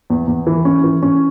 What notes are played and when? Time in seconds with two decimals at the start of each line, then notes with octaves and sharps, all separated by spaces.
0.10 E2
0.27 E2
0.47 E3
0.65 C#4
0.84 E3
1.03 C#4